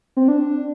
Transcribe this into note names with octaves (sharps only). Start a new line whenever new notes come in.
C4
D4